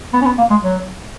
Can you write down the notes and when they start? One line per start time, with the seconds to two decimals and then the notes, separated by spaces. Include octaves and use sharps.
0.13 B3
0.21 C#4
0.26 B3
0.38 A#3
0.50 G#3
0.62 F#3